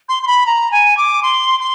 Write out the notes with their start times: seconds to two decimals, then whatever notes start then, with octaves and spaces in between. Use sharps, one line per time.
0.09 C6
0.23 C6
0.27 B5
0.46 A#5
0.71 G#5
0.97 D6
1.23 C6
1.60 C6